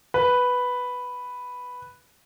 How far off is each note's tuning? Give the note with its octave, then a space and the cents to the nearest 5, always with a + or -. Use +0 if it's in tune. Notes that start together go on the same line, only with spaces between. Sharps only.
B4 +0